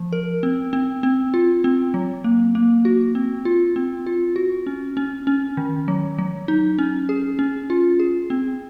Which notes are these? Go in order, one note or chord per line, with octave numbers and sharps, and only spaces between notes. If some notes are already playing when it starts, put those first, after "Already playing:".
Already playing: F3
A#4
C4
C4
C4
F4
C4
F#3
A#3
A#3
F#4
C4
F4
C4
F4
F#4
C#4
C#4
C#4
D#3
F#3
F#3
D#4
C#4
G#4
C#4
F4
G#4
C4